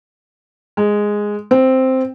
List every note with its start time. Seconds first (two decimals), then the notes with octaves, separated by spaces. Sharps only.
0.77 G#3
1.51 C4